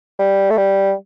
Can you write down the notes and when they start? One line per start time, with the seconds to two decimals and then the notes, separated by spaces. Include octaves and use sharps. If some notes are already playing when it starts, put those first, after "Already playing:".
0.19 G3
0.50 A3
0.57 G3